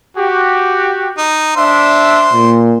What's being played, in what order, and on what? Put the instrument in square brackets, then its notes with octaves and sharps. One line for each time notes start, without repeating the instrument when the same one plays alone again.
[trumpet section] F#4 G4
[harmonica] D#4
[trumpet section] D4 E5 [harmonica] C5
[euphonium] A#2